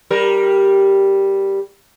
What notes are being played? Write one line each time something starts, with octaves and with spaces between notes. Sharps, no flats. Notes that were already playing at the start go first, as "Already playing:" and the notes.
G3 A#4